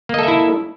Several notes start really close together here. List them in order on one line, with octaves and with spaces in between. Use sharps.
A#3 D#5 A4 E5 E4